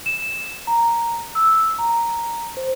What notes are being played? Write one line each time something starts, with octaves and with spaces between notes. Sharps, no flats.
E7
A#5
E6
A#5
C5